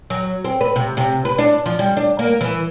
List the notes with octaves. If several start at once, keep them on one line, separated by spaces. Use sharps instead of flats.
F#3
C4
B4
C3
C3
B4
D4
F3
G3
D4
A#3
E3